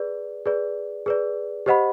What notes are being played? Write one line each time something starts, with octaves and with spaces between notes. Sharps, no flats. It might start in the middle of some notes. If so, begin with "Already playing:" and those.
Already playing: G#4 B4 D5
G#4 B4 D5
G#4 B4 D5
G4 C5 D#5 F#5 B5